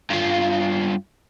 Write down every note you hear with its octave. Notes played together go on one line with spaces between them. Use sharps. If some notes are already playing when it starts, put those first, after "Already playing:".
G2 F4